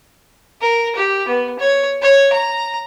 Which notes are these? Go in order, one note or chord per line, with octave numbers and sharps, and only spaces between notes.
A#4
G4
B3
C#5
C#5
A#5